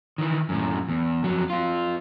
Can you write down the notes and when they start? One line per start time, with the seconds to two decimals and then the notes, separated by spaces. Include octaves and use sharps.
0.18 D#3 E3
0.49 F#2 A2
0.88 E2
1.24 F2 F#3
1.50 C4 F4